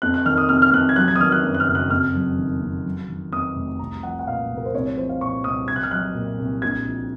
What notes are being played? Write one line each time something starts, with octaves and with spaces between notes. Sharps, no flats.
F2 F#6
F#6
D#3 F6
D#6
C3 F6
F6
F2 F#6
G#6
F#3 F#6
G#6
D#6
D#3 F6
F#6
F#2
F#6
F6
F#1
F#6
F2 F6
F#3
D#3
F2
F#3
D#3
F2 D#6
F1
C2 A#5
F3 F#5
F#5
A#2 F5
C2
A#4
C5
C2 C#5
F3 C5
F5
A#2 C#6
C2 D#6
C2 G#6
F#6
F6
F#3 F#6
A#2
C2
A#1 G#6
F3